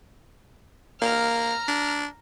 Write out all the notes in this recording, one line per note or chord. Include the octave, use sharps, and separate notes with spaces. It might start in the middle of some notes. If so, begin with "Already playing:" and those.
A#3 A#5 F6
D4